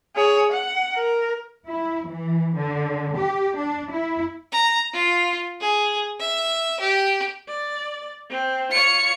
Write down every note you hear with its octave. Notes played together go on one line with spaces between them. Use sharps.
G#4 C#5
F#5
A#4
E4
E3
D3
G4
D4
E4
A#5
F4
G#4
E5
G4
D5
C4
F4 C#5 C#7